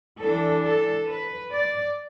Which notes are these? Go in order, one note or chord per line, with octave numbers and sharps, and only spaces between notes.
E3 D4 A4
A4
B4
D5